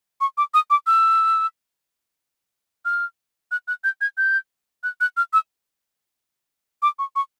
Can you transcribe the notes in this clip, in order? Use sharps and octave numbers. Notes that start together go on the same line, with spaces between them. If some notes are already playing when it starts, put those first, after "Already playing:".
C#6
D6
D#6
D6
E6
F6
F#6
F#6
G6
G#6
G6
F#6
F#6
F6
E6
D6
C#6
C#6